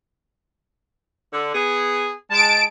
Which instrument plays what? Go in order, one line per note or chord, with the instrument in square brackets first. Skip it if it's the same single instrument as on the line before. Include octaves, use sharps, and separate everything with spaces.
[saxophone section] D3
B3 G#4
[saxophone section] G#3 [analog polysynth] A5 D7